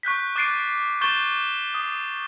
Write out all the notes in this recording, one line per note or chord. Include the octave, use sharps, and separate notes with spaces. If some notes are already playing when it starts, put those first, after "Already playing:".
C#6 F#6 G6 B6
D6 F#6 A6 C7 D7 D#7
C#6 G6 A6 E7 G7
D#6